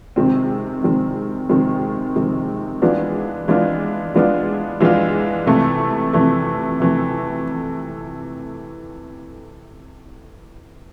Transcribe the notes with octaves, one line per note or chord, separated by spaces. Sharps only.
C3 D#3 G#3 C4
C3 D#3 G#3 C4
C3 D#3 G#3 C4
C3 D#3 G#3 C4
E3 G#3 B3 D4 F4
E3 G#3 B3 D4 F4
E3 G#3 B3 D4 F4
E3 G#3 B3 D4 F4
C3 E3 A3
C3 E3 A3
C3 E3 A3